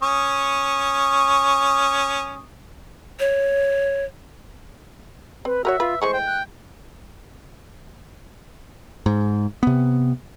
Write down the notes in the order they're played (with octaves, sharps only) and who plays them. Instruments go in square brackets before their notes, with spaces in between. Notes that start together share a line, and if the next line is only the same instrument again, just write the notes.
[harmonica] C#4 C#6 D#6
[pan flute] C#5
[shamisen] C4 [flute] B4
[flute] F#4 [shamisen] A#4 B4 C#5 [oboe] E5
[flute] F4 [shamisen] B4
[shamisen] E3 G#3 A3 [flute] C5 [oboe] C#6
[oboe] G5
[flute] F#6
[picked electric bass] G#2
C3 B3